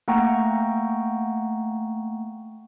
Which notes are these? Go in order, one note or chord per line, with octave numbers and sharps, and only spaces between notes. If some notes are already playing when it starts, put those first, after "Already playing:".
A3 A#3 F#5 G5 A#5 C#6